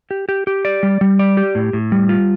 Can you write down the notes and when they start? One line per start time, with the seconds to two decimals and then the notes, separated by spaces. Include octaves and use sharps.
0.11 G4
0.29 G4
0.47 G4
0.65 D5
0.83 G3
1.01 G3
1.19 D5
1.37 G4
1.55 A2
1.73 A2
1.92 G3
2.09 F4